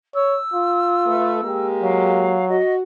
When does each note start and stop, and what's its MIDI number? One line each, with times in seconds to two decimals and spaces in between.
0.15 0.39 73
0.15 1.66 88
0.54 1.45 65
1.06 1.38 57
1.06 1.38 71
1.42 2.38 56
1.42 2.38 58
1.42 2.38 67
1.83 2.61 54
1.83 2.45 77
2.49 2.83 66
2.49 2.74 75